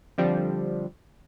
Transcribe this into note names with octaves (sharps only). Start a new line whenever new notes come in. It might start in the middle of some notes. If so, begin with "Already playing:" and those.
D3 F3 G3 C4 D4